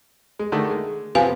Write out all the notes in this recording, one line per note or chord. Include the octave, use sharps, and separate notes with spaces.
G#3
D3 D#3 A3
G#3
C3 F3 B3 B4 F5 G#5